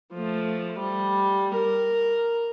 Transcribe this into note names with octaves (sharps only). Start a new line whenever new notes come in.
F3 A3
G3
A#4